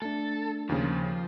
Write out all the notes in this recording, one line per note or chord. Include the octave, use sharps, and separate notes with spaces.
A3 D4 A4
D#2 C#3 F3 F4